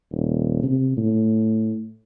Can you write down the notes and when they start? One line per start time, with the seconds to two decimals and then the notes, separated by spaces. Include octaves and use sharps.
0.11 D#1
0.63 C3
0.97 A2